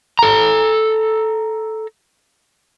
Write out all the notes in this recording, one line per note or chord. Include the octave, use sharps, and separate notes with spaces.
A4 A#5